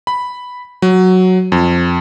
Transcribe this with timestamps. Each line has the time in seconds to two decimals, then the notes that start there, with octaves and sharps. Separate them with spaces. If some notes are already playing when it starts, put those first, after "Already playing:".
0.07 B5
0.82 F#3
1.52 F2